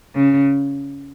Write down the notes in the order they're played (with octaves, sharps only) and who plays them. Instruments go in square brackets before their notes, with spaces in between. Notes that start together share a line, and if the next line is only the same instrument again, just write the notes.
[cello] C#3